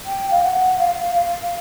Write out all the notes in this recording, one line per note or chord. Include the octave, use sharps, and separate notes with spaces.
G5
F5
F#5
F5
F5